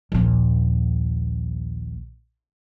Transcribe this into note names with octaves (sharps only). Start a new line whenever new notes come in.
A#1 D#2